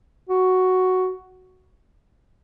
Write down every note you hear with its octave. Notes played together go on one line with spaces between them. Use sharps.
F#4